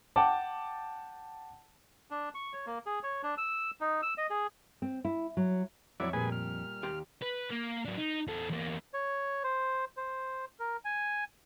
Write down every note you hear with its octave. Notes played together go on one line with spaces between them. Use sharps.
F#5 G5 A5 D6
D4
C#6
C#5
A#3
G#4
C#5
D4
E6
D#4
E6
D#5
G#4
C4
E4
F#3
F2 F#3 E4 C#5 D5 E5
A#2 G3 G#4 B4 G#5
F6
D#2 G4 C6
B4
A#3
F#3 D4
D#4
E2 A4
E2 A#3
C#5
C5
C5
A#4
G#5